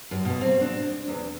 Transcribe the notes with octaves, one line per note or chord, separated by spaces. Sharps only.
F#2
B2
C4
D4
E2